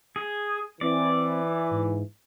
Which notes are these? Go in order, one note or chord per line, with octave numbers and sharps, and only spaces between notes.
G#4
E3 C4 D5
G#2